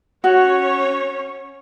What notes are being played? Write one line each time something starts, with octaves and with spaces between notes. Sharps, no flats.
C#4 F#4 C#5